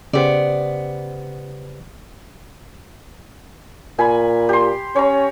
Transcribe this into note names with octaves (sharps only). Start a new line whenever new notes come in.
C#3 B3 G4 C5 D5
A#2 G#5 B5
G4 C6
C#4 C#5 A#5